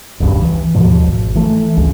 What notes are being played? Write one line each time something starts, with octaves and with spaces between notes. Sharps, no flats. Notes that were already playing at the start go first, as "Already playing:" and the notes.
E1 C#2 G2
E3
D#2 G#2 B2 F3
G#1
E3 A3
G#1 C#2 G#3